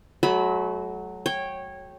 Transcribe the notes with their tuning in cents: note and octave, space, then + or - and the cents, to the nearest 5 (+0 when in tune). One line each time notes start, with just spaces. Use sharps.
F#3 +0 A3 -40 B5 +0
C#5 -15 G5 +0